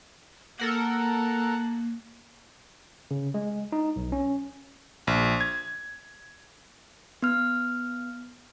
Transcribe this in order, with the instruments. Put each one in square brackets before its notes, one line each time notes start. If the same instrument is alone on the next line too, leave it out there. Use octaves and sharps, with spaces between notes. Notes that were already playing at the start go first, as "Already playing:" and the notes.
[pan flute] A#3 [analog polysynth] A4 A#4 F#5
[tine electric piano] C#3
G#3
D#4
B1
C#4
[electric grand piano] A#1
G#6
[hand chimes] B3 F6